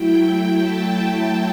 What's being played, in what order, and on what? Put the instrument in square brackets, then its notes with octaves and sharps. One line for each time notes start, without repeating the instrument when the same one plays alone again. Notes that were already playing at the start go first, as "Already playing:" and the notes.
Already playing: [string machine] F#3 A3 E4 G5
G5
A5